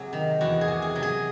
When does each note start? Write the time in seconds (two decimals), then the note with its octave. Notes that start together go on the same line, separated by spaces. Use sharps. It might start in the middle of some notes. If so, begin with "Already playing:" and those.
Already playing: C3 F#3 G#4
0.13 D#3
0.41 E2 F#4
0.61 G#4
0.68 C3
0.82 G#4
0.95 F#3
1.03 G#4